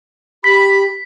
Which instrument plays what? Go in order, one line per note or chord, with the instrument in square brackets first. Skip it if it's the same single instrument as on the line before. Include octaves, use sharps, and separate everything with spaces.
[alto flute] G4 [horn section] B5 [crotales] B6